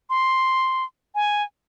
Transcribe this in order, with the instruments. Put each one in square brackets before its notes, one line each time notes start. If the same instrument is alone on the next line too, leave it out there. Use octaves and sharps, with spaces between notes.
[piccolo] C6
G#5